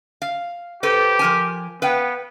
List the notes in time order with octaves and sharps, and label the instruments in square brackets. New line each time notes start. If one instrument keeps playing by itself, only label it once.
[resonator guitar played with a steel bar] F5
[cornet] G4 [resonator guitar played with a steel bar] A4 B4 C5
[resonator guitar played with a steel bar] F3 A#4 G#5
[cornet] B3 [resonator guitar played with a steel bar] B4 F5 G5